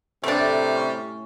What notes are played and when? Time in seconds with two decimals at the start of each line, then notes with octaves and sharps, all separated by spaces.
0.24 A2 C3 G3 A3 D4
0.74 C#4